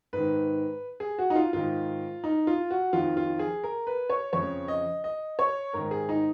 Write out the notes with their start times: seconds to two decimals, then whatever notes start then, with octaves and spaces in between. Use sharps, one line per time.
0.13 G#2 D#3 B4
1.00 G#4
1.19 F#4
1.30 D#4
1.36 F4
1.53 G#2 D#3 F4
2.24 D#4
2.47 F4
2.71 F#4
2.93 F2 D#3 F4
3.17 F4
3.39 G#4
3.64 A#4
3.87 B4
4.10 C#5
4.33 F2 C#3 C#5
4.68 D#5
5.04 D#5
5.39 C#5
5.73 G#2 D#3 A#4
5.91 G#4
6.09 D#4